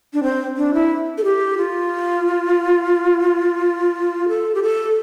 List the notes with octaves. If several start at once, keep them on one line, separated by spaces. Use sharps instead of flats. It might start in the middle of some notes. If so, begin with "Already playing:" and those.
D4
C4
D4
E4
A4
G4
F4
A4
G4
A4